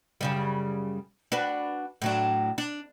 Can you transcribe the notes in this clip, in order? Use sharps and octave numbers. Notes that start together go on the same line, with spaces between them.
F#2 C#3 G3
D4 F#4 B4
A2 F#3 D4
D4